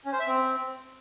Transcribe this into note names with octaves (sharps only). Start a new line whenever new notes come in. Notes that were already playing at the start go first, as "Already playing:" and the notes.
C#4
C5
E5
C4